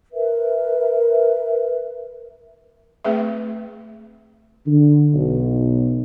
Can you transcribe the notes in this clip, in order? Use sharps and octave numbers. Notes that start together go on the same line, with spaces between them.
A#4 B4 E5
A3 C4 G#4 B4 E5
D3
B1